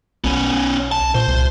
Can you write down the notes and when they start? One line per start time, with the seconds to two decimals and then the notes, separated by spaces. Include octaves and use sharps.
0.24 B1 B3 C#4
0.92 A5
1.15 A#2 C5
1.28 C2